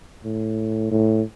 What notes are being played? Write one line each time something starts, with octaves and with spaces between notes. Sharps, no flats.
A2
A2